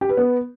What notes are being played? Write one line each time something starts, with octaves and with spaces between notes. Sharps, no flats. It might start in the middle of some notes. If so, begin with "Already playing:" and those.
G4
B4
B3